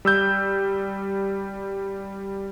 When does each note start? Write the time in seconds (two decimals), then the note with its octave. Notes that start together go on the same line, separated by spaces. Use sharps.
0.05 G3 E6 G6